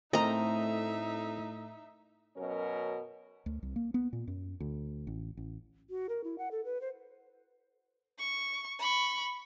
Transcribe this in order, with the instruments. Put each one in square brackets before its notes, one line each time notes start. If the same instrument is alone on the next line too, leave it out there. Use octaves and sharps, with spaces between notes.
[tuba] A2 [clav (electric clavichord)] A3 C4 A#4 [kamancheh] D#4 E5 [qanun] D#5 A#5
[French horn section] F#2 B2 F#3 C#4 A#4
[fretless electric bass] D2
C2
A#3
B3
A#2
F#2
D2
A1
A1
[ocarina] F#4
A#4
E4
F#5
A4
B4
C5
[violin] C#6
B5 C#6